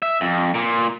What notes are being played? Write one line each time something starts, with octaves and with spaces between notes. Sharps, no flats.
E5
F2
A#2